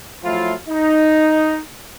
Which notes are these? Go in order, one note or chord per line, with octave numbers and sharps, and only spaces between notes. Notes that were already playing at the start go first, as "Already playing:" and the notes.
F3 F#3 A3 E4 F4
D#4